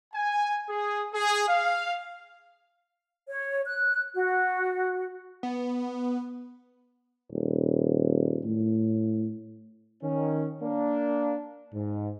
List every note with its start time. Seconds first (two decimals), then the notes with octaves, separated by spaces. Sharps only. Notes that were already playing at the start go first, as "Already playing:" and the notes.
0.13 G#5
0.68 G#4
1.13 G#4
1.47 F5
3.29 C#5
3.66 F#6
4.13 F#4
5.43 B3
7.31 D#1
8.45 A2
10.02 D#3 C#4
10.62 A#3 D4
11.74 G#2